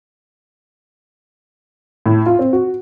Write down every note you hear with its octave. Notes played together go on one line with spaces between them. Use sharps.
A2
F4
C4
F#4